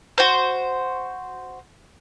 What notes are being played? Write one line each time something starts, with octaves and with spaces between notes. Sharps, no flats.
F#4 C5